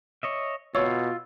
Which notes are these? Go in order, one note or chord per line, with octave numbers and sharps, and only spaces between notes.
C#5 D#5 E5
B2 F4 C#5 E6